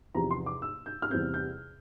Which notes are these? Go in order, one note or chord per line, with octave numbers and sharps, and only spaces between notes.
E2 C3 F3 A#5
C6
D6
E6
G6
F6
E2 C3 G3 C4 G6
G6